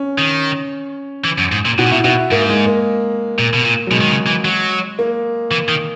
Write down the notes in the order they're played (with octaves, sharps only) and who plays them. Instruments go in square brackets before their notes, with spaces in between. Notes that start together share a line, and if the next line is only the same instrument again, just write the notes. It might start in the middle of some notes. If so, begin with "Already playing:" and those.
Already playing: [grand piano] C#4
[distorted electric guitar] D#3
E3
F#2
G#2
A#2
[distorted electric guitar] B2 [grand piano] F#4
[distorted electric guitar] A#2
[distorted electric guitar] B2 [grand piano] E4
[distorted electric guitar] B2 [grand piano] F#4
[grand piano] E4
[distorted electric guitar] G#2 [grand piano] A#3
[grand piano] G#3
A#3
[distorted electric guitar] A#2
B2
A#2
[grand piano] F#3
[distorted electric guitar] B2 [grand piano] G#3
[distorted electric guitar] D#3
C#3
E3
F#3
[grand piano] A#3
[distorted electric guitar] E3
D#3